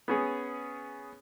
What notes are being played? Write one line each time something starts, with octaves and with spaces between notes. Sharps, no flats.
B3 C#4 G#4